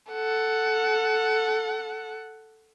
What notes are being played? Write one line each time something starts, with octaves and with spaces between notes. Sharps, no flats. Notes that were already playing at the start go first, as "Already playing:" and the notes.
A4 F#5